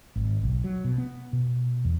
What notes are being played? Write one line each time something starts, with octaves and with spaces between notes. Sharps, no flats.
G#1
B1
F#3
B2
B3
B2
E2